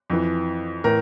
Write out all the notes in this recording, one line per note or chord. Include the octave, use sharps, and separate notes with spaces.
F2 E3
A2 E3 A#4